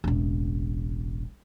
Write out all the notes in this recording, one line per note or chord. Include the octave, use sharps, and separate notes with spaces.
E1 A1